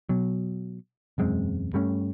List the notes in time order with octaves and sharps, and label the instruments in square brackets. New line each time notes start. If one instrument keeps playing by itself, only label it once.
[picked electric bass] B2 F#3
E1 F#2 G#3 C4
G2 G3 A3 C#4